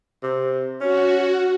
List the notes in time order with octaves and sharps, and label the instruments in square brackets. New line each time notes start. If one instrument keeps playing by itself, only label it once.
[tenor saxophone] C3
[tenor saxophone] C#4 [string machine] F#4